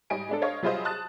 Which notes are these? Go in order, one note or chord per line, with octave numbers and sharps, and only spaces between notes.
G#2 G3 D#5 G#5 D7
G#3 D4 A4
C5 C#5 D#5 F5 C#6 G#6
F#3 G3 F4 G#4 C5 D#5
A5 D#6 F#6 A6